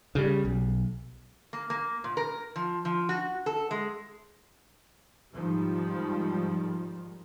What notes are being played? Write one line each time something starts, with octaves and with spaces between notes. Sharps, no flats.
C#3 G3
B1
A#3
A#3
A#2
A#4
F3
F3
F#4
A4
G#3
G#2 D#3 F3 G3